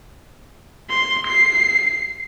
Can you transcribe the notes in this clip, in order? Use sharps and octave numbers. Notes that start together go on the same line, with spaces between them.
C6
C7